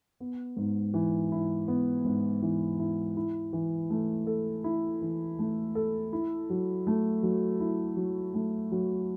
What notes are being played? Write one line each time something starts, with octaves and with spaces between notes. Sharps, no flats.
B3
G#2
E3
E4
B3
G#2
E3
E4
E4
E3
A3
A4
E4
E3
A3
A4
E4
F#3
A3
F#3
E4
F#3
A3
F#3